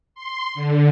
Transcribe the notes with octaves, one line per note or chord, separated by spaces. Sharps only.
C6
D3